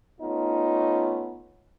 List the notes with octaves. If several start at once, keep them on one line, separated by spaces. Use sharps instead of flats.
A3 B3 C#4 D#4 F4